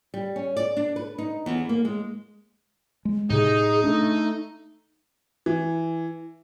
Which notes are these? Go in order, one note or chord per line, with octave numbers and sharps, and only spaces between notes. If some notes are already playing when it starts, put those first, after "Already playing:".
G3
C#4
D5
D4
B4
D#4
E2
A#3
G#3
G#3
A2 C3 D#4 G#4
A3 D4
E3